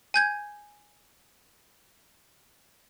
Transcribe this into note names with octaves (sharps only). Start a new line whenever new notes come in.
G#5 G6 G#6